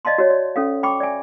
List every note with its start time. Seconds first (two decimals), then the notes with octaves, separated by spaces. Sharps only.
0.05 D5 D#5 F5 A5 C6
0.18 F#4 C#5 D5
0.30 D5
0.56 C#4 A4 F5
0.83 G5 B5 C#6 D6
1.00 D5 E5 G#5